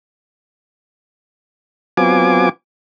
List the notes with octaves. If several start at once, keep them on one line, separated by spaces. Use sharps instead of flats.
F#3 B3 C4 F4 G#5 D6